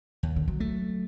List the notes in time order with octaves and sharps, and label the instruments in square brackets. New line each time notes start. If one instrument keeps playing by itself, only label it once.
[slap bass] D#2
[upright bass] D3
F#3
[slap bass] A3